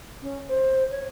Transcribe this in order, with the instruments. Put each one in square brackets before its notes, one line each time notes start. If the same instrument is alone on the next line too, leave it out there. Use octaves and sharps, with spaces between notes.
[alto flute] C#4
C5
C#5